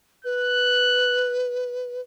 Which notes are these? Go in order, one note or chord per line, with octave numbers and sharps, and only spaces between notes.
B4 F#6